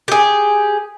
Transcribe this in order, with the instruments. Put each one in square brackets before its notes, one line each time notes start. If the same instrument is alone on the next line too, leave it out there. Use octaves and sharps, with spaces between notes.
[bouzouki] G4 G#4